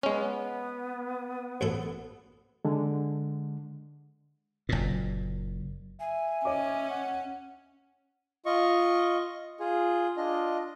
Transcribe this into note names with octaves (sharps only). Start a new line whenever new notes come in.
G#3 B3 C#4
A1 F#2 A4
D3 G#3
F#1 A#2
E5 G#5
C#4 C#5 D#5 D6
F#5
F4 D#5 C#6
F4 G#4
D4 F4 D#5